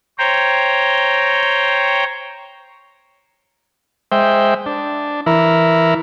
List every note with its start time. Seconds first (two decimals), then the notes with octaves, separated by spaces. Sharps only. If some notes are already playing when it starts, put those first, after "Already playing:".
0.18 C5 C#5 G5 A#5
4.12 G#3 C5 E5 G5
4.66 D4
5.26 E3 E4 A#4